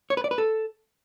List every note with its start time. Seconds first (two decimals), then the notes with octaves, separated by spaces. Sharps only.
0.10 C#5
0.17 B4
0.24 D5
0.31 B4
0.38 A4